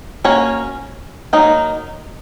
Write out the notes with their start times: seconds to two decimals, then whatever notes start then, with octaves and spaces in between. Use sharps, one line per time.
0.24 A#3 C#4 F#4 C#5
1.33 F#3 A#3 D#4